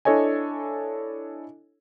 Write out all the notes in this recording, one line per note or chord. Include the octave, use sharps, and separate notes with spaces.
D4 E4 A4 C#5 D#5 G#5